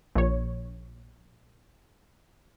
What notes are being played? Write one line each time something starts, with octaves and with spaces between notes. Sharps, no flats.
A#1 C#5